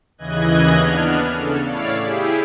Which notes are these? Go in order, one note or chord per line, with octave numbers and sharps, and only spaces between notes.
D#2 C#3 E3 D#5 F#6 G#6
B3 D4 F6
C#3 A4
A2 E4 C#5 D5 F5
E4 G4 G#4